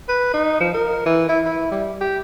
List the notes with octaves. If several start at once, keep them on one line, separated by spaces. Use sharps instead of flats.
B4
D#4
F3
A#4
E3
E4
E4
G3
G4